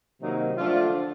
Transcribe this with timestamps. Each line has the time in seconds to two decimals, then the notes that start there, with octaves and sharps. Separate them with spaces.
0.20 C3 D#3 F#3 A#3 D#4
0.58 D3 F3 A3 D4 F4